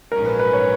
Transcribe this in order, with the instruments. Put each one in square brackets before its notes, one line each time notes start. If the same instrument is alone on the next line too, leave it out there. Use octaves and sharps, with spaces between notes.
[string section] A#1 G#2 F#3 C#4 [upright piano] A#4
[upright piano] B4
B4
C#5